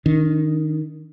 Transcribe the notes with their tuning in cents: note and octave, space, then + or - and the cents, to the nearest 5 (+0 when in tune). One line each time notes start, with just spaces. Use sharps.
D#3 +0 D4 -35